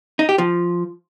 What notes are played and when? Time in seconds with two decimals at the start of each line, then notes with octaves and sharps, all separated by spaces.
0.19 D#4
0.29 G4
0.38 F3